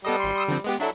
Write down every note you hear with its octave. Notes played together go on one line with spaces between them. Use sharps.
G3 B3 A4 D#5
G#1 C6
C6 D#6 E6
D3 F3 C4
G#3 B3 G4
F#3 D4 E4 A4